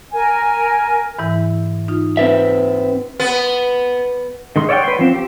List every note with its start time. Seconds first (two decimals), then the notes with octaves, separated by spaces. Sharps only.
0.12 A#4 G#5
1.19 G#2 E3 E4
1.88 D#4 F4
2.17 C4 B4 E5
3.20 B3
4.56 D#3 G#3 C6
4.69 C#5 D5 E5 F#5 G5
4.84 B4 C6
4.99 F3 C4
5.14 G4